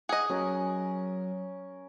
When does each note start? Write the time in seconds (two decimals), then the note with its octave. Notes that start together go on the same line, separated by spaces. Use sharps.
0.09 G#4 D#5 F#5 F#6
0.30 F#3 C#4 A#4